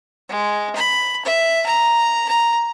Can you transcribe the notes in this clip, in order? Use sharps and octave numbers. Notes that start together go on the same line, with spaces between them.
G#3
B5
E5
A#5
A#5